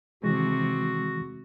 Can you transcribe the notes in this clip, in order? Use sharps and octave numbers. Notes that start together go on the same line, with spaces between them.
C3 D#3 E3 G#3 F#4